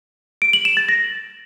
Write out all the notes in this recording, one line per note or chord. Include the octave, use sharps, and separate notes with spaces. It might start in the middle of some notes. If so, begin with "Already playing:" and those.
D7
F#7
E7
A6
A#6